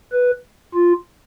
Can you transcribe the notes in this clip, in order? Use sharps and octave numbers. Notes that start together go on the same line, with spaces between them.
B4
F4